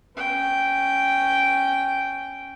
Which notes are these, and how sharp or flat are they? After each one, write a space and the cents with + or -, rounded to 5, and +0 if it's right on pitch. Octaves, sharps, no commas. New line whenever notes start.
C#4 +0 G5 -5